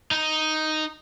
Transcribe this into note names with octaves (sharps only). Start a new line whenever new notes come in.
D#4